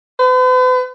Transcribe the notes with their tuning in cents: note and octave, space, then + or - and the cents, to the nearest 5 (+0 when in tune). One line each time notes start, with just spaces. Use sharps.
B4 +45